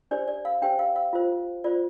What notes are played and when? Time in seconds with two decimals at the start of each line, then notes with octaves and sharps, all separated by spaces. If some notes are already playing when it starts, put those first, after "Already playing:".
0.11 D4 G4 C5 D5
0.28 D5
0.45 F5
0.62 D4 G4 C5 G5
0.79 F5
0.96 F5
1.13 F4 C5
1.64 F4 C5 D5